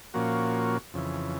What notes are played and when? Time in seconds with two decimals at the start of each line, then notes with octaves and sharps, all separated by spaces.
0.14 A#2 F3 A#3 C#4 F#4
0.94 F2 C#3 E3